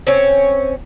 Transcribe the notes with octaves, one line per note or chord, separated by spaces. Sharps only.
C4 C#4 C#5